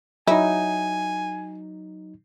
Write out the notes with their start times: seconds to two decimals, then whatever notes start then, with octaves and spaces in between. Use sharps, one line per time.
0.27 F#3 D#4 E4 G#5